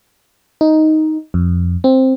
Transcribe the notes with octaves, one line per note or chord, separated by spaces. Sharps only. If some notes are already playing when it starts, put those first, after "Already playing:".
D#4
F2
C4